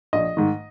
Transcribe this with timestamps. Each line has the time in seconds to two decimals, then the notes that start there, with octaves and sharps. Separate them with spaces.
0.13 A#1 D#5
0.37 G#2 D#3